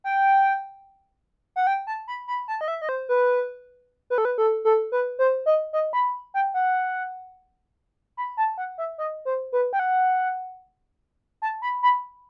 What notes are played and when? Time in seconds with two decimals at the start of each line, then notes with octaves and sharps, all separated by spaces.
0.04 G5
1.56 F#5
1.67 G5
1.87 A5
2.08 B5
2.28 B5
2.48 A5
2.61 D#5
2.68 E5
2.82 D#5
2.89 C5
3.09 B4
4.10 B4
4.18 A4
4.25 B4
4.38 A4
4.65 A4
4.92 B4
5.19 C5
5.46 D#5
5.73 D#5
5.93 B5
6.34 G5
6.54 F#5
8.17 B5
8.37 A5
8.58 F#5
8.78 E5
8.98 D#5
9.25 C5
9.52 B4
9.73 G5
9.79 F#5
11.42 A5
11.62 B5
11.83 B5